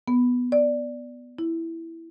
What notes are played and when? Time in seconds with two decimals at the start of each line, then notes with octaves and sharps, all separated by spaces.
0.08 B3
0.52 D5
1.39 E4